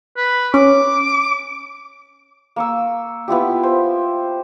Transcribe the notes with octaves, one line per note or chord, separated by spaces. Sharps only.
B4
C#4 D6
A#3 C#6 E6
B3 E4 F4 G4
C5